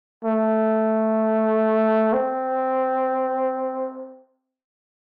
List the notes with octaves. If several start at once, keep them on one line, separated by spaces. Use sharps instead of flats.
A3
C4